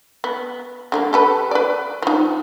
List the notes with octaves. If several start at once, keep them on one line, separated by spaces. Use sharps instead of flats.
B3
D3 G3 A#3
G4 A4 B4
B4 D5
F3 D#4